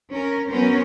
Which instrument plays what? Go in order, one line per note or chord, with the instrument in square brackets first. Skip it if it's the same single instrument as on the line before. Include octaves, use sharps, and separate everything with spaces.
[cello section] C#4 A#4
F#3 B3 C#4 A#4 C5